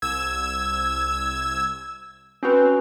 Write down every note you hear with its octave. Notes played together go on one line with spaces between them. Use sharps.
C2 E6 G#6
C4 C#4 F#4 B4